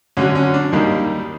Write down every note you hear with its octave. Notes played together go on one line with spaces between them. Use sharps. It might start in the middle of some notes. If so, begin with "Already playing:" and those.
D2 D3 F#3 C#4
C#4
D4
D#2 D#3 G3 A#3 D#4